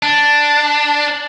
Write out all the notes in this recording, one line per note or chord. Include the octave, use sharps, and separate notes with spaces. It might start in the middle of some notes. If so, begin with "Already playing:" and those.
D4